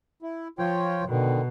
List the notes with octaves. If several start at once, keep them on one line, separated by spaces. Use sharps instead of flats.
E4
F3 F4 C#5 G5
B2 D3 D#3